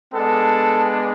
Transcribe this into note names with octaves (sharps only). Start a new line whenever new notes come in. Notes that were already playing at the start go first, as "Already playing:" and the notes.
G#3 B3 D4 A4